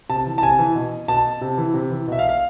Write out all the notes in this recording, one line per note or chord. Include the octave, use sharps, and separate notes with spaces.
C3 A5
E3
A5
C3 G#5
E3
B2
B2 A5
C3
E3
C3
E3
B2 E5
F5
F5